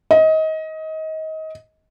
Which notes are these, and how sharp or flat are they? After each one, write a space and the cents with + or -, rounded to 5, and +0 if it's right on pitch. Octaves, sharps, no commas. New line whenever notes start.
D#5 +25